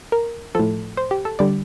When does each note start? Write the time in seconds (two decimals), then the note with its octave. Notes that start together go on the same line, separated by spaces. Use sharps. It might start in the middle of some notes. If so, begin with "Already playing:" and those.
0.12 A#4
0.55 A2 F3 A4
0.97 C5
1.11 G4
1.25 A4
1.39 D3 G3 D5